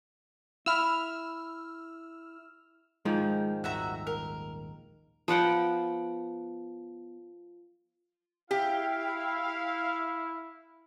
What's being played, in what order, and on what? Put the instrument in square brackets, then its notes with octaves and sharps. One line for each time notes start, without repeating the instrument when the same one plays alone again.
[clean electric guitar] E4 [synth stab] E6 F6
[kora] G#2 D#3 F3 [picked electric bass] G#3
[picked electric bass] D#1 G#1 [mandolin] F#4 E5 A#5
[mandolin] A#4
[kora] F3 B3 F#5 G5
[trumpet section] E4 [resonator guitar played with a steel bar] G4 [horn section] F5